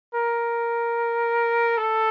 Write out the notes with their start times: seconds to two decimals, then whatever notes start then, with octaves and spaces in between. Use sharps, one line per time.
0.14 A#4
1.77 A4